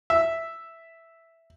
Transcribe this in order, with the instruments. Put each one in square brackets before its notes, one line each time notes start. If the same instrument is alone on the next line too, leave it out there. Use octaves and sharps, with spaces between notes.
[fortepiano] E5